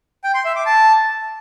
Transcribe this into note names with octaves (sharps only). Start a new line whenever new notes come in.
G5
C6
E5
D6
A5